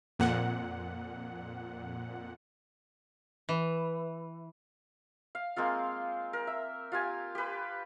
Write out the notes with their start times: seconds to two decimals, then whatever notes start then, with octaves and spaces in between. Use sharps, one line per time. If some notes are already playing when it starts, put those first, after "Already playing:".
0.19 F2 A#2 F#5
3.49 E3
5.35 F5
5.56 G#3 A#3 C4 F4
6.33 A#4
6.47 E5
6.92 F4 G4 G#5
7.35 G4 B4